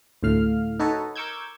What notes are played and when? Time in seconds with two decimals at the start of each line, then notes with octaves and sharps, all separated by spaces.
0.23 D2 A2 F5 F6
0.80 D#4 F#4 A4 B4 C#5 D#5
1.16 A#4 C#6 D6 E6 G6 G#6